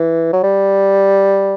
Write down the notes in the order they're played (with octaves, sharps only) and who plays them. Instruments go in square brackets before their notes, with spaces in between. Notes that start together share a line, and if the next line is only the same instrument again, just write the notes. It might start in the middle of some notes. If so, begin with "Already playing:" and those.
Already playing: [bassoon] E3
F#3
G3